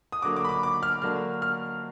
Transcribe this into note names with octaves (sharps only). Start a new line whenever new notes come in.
D#6
D3 F#3 A#3 D6
D6
B5
D6
D6
F6
D3 F#3 A#3 D4 F6
F6